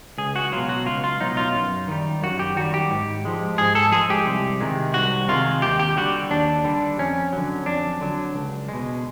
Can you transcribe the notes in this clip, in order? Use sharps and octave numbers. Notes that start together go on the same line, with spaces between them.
C#2 G#4
F#4
B2 F#3 F4
F#4
C#2 F4
F4
B2 F#3 D#4
F4
F#2
D#3 G3
F#2 F#4
G4
D#3 G3 F#4
G4
G#2
F3 G#3
G#2 G#4
A4
F3 G#3 G#4
G4
C2
C3 D#3 G#3
C2 F#4
C3 D#3 G#3 F4
D#2 G4
G4
D3 G3 F#4
D#2 D4
D3 G3
F2 C#4
D3 F#3
F2 D4
D3 F#3
C#2
B2 G#3